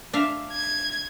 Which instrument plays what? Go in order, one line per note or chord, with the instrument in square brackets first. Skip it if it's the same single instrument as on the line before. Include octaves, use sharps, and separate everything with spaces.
[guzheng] D4 E5 F5
[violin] G#6